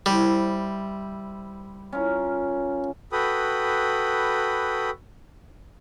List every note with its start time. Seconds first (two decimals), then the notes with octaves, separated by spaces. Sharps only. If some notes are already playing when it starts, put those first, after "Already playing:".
0.06 G3 E4 C5
1.92 C#4 F4 A#4
3.12 F#4 A4 B4 G5 B5 D#6